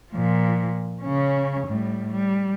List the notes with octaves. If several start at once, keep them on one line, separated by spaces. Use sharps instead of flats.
A#2 F3
C#3 C#4
A2 G3
G3